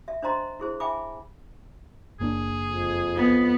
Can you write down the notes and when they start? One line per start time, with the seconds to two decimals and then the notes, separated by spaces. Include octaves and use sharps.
0.08 E5
0.23 D4 C5 D#5 A#5 C6
0.60 E4 G#4 C5
0.80 E5 G5 G#5 B5 D6
2.20 F#1 A#3 D4 G#4
2.68 F2
3.16 B3